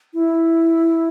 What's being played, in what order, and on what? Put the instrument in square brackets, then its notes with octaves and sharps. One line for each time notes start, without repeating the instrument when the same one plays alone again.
[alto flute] E4